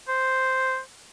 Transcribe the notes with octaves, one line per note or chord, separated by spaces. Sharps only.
C5